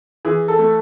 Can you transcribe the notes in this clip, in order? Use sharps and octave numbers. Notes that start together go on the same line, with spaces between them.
E3 G#4
A4
A3